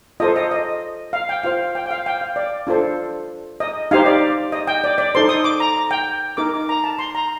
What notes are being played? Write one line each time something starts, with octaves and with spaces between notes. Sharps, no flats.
F4 A4 C5 D#5
D#5
D#5
F5
G5
F4 C5 F5
G5
G5
F5
G5
F5
D5
D4 F4 A4 C5
D#5
D#4 G4 C5 F5
D5
D#5
G5
D5
D5
D#4 A4 C5 C6
D#6
D6
A#5
A#5
G5
D#4 A#4 D6
D6
A#5
A5
C6
A#5